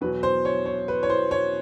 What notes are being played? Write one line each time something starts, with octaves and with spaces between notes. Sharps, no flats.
E2 B2 F#3 B4
C5
C#5
C#5
B4
C#5
C5
C#5